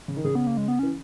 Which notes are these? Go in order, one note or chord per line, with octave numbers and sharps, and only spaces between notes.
C#3
D#3
C#3 G#4
B3
A#3
G#3
B3
E3 C#4